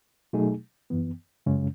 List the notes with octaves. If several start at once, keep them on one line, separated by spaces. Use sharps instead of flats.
B2 F#3 A3 D#4 G#4
F#2 E3 B3
F#2 C#3 G#3 C#4